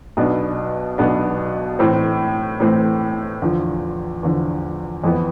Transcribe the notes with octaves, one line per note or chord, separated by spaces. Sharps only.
B1 B2 B3 D4
B1 B2 B3 D4
A2 E3 A3 C4
A2 E3 A3 C4
E2 D3 F3
E2 D3 F3
F2 E3 B3